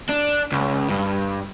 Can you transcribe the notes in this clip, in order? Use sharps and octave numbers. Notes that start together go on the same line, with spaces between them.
D4
C#2
G2